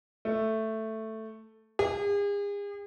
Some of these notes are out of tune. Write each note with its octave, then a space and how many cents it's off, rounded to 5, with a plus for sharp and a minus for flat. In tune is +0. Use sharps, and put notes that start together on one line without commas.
A3 +5
G#4 -40